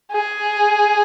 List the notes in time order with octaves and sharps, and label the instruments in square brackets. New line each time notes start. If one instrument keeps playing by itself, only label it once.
[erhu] G#4